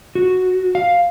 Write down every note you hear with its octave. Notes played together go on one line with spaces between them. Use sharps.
F#4
F5